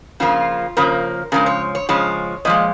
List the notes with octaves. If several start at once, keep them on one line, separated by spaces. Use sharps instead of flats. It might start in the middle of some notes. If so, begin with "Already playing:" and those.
C#3 F3 A#3 F4
C#3 F3 A#3 A#4
C#3 F3 G#3 A#4
C#5
C#5
C#3 F3 G#3 C#5
A#2 F3 G#3 D#5